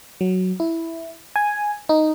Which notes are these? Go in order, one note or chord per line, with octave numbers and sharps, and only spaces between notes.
F#3
E4
G#5
D#4